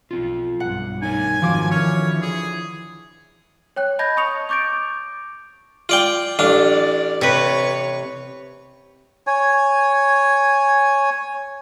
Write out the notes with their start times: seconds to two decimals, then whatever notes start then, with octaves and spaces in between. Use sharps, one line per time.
0.11 B1 C4 F4
0.60 B1 G2 F#5
1.02 D#4 A#4 C#5 G#5
1.42 G#1 F2 D#3 F3 F#4 C5 D6
1.71 D3 E3 C#5 F6
2.22 G#4
3.76 C#5 G5 F#6
3.99 D#5 A5 B5 G6 G#6 A#6
4.17 A5 C#6 D#6 C#7 F7
4.49 C#6 D6 G6 A6 D7
5.89 F4 D5 G5
6.39 A1 D4 D5 F5
7.21 C3 B4 C#5 C#6
9.27 C#5 G#5